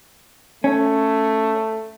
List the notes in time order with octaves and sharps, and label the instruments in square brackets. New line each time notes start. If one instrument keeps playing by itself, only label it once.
[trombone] A3 [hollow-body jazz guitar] C#4